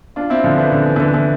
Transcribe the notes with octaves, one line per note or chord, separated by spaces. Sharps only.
D4 F4
C4 E4
D3 F3
E3
D3
E3
E3
D3
E3